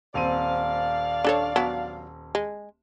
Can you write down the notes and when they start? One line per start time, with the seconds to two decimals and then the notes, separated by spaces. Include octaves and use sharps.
0.14 D#1 C4 D5 F5 D#7
1.24 D4 A4 C#5
1.56 F#3 B3 D4
2.35 G#3